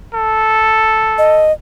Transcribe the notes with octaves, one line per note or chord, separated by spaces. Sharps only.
A4
D#5